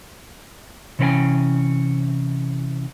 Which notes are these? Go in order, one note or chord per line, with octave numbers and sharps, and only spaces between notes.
C3 E3 C#4 B4 G5 G#5